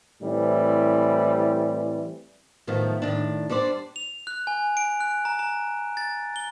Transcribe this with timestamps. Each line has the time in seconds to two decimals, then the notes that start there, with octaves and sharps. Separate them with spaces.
0.22 A2 E3 G3 C4
2.67 A2 D#3 F3 F#3 A3 B3
3.02 A2 D#3 D4
3.50 G3 D4 C5 D5
3.96 F7
4.27 F#6
4.47 G#5
4.77 D7
5.00 F#6
5.25 A#5
5.39 A#5
5.97 A6
6.36 G7